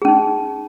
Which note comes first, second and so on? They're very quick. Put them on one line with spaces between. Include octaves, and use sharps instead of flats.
G#4 C#4 D#4